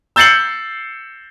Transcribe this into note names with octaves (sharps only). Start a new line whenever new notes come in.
E6 G6 A6 C7 C#7 F#7